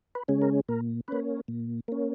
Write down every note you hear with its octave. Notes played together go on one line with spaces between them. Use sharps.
B4
C#3 G#3 C#4
A#4
A#2 A#4
A#3 C#4 B4
A#2
A#3 C#4